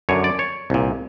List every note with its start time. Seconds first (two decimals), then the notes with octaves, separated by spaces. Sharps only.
0.09 F#2 D3 C#5
0.24 D5
0.39 C#5
0.70 C2 A#2